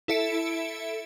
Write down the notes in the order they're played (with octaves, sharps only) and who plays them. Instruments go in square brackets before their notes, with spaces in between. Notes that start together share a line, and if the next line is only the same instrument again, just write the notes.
[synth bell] E4 A4 E5 C#7 D7